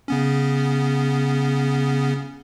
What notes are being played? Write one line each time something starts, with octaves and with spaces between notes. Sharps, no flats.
C#3 B3 C#4